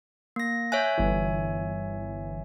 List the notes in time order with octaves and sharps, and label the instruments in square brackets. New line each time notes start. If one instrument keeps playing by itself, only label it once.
[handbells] A#3 A#6
[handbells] C#5 E5 G#5 [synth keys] F#6 G6
[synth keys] G1 E3